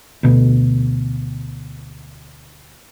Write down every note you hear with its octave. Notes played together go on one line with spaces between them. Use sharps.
D2 B2